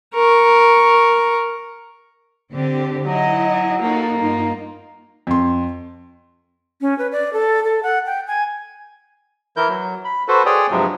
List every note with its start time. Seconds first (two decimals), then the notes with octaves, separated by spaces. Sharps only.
0.14 A#4 C#6
2.52 D3 C4 G4
3.05 F#3 E4 D#5
3.82 A#3 D#4 F#4 A4
4.19 G2 D#4 F4
5.27 F2 C6
6.81 C#4
6.98 B4
7.12 D5
7.33 A4
7.64 A4
7.83 F#5
8.06 G5
8.27 G#5
9.57 E3 E4 A#4 G6
9.69 F#3
10.05 B5
10.28 F#4 A4 B4 C5
10.46 G#4 C#5 D5 G5 D#6
10.71 G2 C3 F3 F#3 G#3